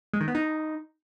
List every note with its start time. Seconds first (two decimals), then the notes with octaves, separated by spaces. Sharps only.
0.13 G#3
0.21 D#3
0.28 B3
0.35 D#4